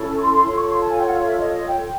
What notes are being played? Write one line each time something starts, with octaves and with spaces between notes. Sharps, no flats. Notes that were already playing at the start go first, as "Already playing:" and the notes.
Already playing: C#4 E4 A4
A5
C#6
C6
C6
F4 A4 C#5 C6
C#6
C6
A5
G#5
G5
F#5
F5
E5
D#5
D#5
G5